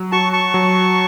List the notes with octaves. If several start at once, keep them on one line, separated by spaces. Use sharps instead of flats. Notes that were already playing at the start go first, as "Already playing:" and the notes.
Already playing: F#3
F#4 A5 C#6
A5 C#6
F#3